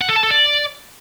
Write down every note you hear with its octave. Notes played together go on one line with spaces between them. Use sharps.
F#5
A4
A5
A4
D5